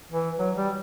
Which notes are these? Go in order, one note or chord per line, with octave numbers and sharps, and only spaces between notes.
E3
F#3
G3